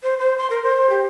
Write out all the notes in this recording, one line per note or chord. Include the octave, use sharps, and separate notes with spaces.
C5
C5
C6
A#4
C5
G4